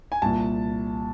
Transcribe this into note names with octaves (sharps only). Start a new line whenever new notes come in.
G#5
C2 A#2 A5